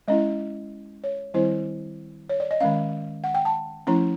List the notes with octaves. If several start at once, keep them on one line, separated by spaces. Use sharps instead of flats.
G#3 C#4 E4 D#5
C#5
D#3 G3 C4 E4 C5
C#5
D5
D#5
D#3 G#3 C#4 F5
F#5
G5
A5
F3 A3 C#4 E4 A#5